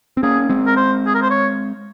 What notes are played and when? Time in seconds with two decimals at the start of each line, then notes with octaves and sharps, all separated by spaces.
0.17 C4
0.23 A#3 C#4 G#4
0.49 G#3 C4
0.67 A#4
0.76 C5
1.06 G#4
1.15 A#4
1.22 C5
1.30 C#5